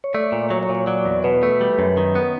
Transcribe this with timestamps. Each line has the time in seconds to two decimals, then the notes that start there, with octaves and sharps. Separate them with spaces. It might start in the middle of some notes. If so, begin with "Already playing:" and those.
0.04 C#5
0.14 A3 D5
0.32 A#2
0.50 F#3 C#5
0.63 C#5
0.69 A#2
0.75 C#5
0.87 F#3 D5
1.05 E2
1.24 B2 B4
1.43 A3
1.61 G3
1.79 F#2
1.97 D#3
2.15 B3